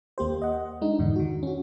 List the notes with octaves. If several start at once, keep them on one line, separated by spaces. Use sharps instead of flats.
D#2 A#3 G4 C5
D#5 F#5
G#3 D4 D#4
E2 G#2 D3
D#3 F#4
C#4 F#4